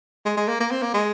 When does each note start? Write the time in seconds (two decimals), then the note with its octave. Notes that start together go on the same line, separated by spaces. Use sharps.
0.26 G#3
0.37 G#3
0.48 A#3
0.60 A#3
0.71 C4
0.82 A#3
0.94 G#3